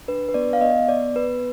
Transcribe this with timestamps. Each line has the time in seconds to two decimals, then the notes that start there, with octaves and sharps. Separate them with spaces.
0.08 D4 B4
0.29 B4
0.34 B3 D5
0.53 F5
0.61 B3 D#5
0.88 B3 D5
1.15 B3 B4